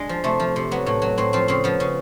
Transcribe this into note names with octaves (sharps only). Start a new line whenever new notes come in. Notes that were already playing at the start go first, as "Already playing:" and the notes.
Already playing: G#3 D4
F3
C3 A3
F3
C3
F#3 B3
A2
F#3
A2 C4
F3 C4
C#3 C4
F3 B3
C#3